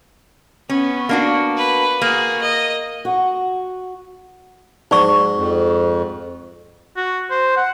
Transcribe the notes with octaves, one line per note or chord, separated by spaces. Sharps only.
B3 C#4
A#3 D4 F#4
B4
A#3 F#4 G#4
D#5
F#4
G#2 D#4 F#4 D5 C#6
F2
F#4
C5
F#5